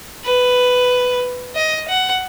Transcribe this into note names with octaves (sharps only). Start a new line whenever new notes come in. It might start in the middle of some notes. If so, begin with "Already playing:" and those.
B4
D#5
F#5